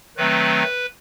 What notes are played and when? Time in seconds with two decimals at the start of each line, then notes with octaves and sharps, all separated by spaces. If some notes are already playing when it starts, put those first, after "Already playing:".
0.17 D#3 F#3 A3 C4 B4